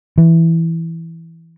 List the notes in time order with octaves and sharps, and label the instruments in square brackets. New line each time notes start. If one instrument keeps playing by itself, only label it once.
[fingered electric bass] E3